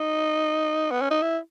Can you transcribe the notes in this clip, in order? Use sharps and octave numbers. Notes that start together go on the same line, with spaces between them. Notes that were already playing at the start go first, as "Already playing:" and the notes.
Already playing: D#4
B3
C#4
D#4
E4